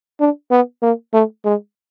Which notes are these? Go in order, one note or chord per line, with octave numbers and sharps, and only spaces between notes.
D4
B3
A#3
A3
G#3